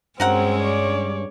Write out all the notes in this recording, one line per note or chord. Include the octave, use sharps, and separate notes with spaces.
G2 G#3 C4 C#4 F#4 A#4 F#5
C#5 D5